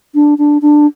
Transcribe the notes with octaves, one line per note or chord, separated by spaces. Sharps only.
D4
D4
D4